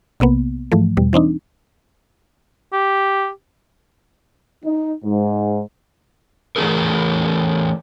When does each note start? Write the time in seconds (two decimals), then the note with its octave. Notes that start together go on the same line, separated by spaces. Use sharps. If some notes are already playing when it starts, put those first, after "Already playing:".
0.20 B1 C3 A#3 B3
0.72 G#2 E3 F3 A3
0.97 E2 B2 G3
1.13 E3 C4 D4 D#4
2.73 G4
4.65 D#4
5.05 G#2
6.56 E3 A3 B3 G#4 A#4